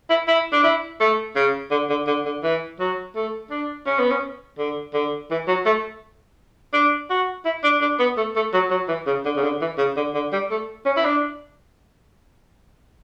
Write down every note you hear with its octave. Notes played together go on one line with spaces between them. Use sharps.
E4
E4
D4
E4
A3
C#3
D3
D3
D3
D3
E3
F#3
A3
D4
C#4
B3
C#4
D3
D3
E3
F#3
A3
D4
F#4
E4
D4
D4
B3
A3
A3
F#3
F#3
E3
C#3
D3
C#3
D3
E3
C#3
D3
D3
G3
A3
C#4
E4
D4